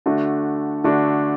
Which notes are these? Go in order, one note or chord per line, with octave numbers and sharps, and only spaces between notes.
D3 A3 D4 F#4
D3 A3 D4 F#4